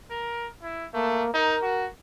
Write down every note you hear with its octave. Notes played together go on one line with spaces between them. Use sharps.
A#4
E4
A3 A#3
D#4 A#4
F#4